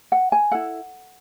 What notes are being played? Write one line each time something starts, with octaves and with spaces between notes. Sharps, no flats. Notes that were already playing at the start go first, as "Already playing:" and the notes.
F#5
G#5
E4 A4 F#5